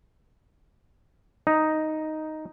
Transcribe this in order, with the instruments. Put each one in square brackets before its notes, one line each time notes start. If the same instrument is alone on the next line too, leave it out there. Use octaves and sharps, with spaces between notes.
[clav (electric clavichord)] D#4